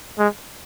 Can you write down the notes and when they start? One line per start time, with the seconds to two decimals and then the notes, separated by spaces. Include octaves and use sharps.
0.19 G#3